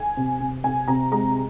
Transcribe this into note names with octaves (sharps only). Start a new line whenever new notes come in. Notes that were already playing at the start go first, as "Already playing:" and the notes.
Already playing: G#5
C3
C3
C3 G#5
C3 A#5
G#3 A#5